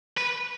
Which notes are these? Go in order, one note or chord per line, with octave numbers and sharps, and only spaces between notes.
B4